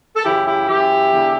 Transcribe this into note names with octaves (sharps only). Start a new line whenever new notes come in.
A4
F#2 C#3 E3 E4 G4
E4 G4
F#2 E3 E4 G4
E2 D3